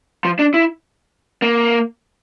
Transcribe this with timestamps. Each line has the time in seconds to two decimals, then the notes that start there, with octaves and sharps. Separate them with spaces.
0.25 F3
0.39 D4
0.54 E4
1.42 A#3